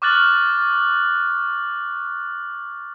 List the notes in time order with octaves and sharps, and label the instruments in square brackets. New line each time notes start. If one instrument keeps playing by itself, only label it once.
[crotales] C#6 D6 F6 F#6 A6 F#7